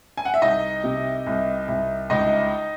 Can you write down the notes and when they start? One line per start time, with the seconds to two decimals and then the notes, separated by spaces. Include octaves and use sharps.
0.17 G#5
0.25 F#5
0.34 E5
0.42 C2 D#4 D#5
0.84 C3
1.27 C2
1.68 C2
2.10 C#2 D#4 D#5